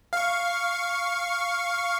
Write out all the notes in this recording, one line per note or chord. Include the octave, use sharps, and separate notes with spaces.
F5 C#6